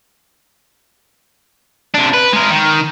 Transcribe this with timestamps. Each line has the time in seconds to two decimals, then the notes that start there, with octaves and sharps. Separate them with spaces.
1.95 C3 D4
2.14 B4
2.33 G#3 A#4
2.50 D#3